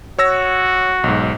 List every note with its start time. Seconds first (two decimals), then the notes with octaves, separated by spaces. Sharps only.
0.19 F#4 C#5 E6 A#6
1.04 B1 G#2